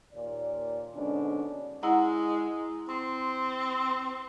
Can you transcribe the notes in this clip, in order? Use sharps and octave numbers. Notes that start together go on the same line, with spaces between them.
D#2 A#2 D5
G#2 B2 D3 C#4 D4
G#3 E4 F#5 A#5
C4 C6